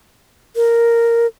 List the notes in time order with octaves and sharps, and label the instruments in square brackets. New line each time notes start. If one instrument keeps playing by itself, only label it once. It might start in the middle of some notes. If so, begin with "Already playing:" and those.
[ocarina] A#4